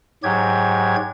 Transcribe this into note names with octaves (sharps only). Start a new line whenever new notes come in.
G#2 F#3 G4 G#6